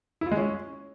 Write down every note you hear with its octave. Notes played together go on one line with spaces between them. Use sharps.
E4
F4
G#3
C#4